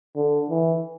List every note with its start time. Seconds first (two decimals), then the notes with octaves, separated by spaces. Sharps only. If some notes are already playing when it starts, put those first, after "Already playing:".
0.16 D3
0.50 E3